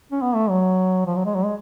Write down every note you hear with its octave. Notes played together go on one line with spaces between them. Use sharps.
C#4
B3
A3
F#3
F3
F#3
G#3
F#3
G#3